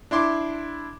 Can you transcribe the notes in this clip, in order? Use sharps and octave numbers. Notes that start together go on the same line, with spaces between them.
D4 E4 C6 D6